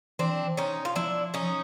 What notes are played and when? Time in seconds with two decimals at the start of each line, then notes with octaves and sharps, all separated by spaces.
0.19 E3 C4 D4
0.57 C#4 D#4
0.85 F4
0.96 F3 D4 E4
1.34 C#4 D#4